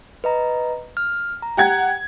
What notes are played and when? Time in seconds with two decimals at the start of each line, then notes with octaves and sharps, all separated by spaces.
0.24 B4 D#5 A#5
0.97 F6
1.42 A#5
1.57 G4 F#5 G#6